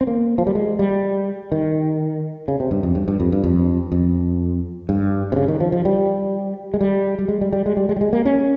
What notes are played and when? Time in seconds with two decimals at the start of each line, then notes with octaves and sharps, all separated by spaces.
0.01 C4
0.07 A#3
0.38 F3
0.47 G3
0.55 G#3
0.79 G3
1.52 D#3
2.48 C#3
2.60 C3
2.71 G2
2.83 F2
2.95 G2
3.08 G2
3.20 F2
3.32 G2
3.44 F2
3.92 F2
4.89 G2
5.32 C3
5.36 C#3
5.48 D#3
5.60 F3
5.72 F3
5.85 G3
6.74 G#3
6.81 G3
7.19 G3
7.28 G#3
7.41 G3
7.53 G3
7.66 G#3
7.77 G3
7.89 G#3
7.96 G3
8.01 G#3
8.13 A#3
8.25 C#4